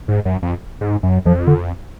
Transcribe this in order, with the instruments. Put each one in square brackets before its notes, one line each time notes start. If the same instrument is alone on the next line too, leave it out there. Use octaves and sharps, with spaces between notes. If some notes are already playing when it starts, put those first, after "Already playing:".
[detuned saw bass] G#2
F#2
F2
G#2
F#2
[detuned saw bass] F2 [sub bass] F3
[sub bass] D3